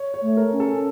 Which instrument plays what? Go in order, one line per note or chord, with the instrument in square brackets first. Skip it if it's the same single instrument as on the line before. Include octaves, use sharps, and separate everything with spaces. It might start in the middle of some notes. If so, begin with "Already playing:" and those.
Already playing: [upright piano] C#5
C#5
[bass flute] A3
[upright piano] A#4
[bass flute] C#4
[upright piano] A4